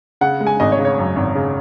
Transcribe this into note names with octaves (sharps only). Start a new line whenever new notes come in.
C#3 F#5
G#3
G#5
G#1 D#5
C#5
C#3
C#5
F#2
G#1
C#3